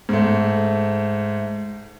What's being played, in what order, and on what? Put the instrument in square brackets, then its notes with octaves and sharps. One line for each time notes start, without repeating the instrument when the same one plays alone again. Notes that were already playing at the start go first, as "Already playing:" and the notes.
[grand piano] G#2 A3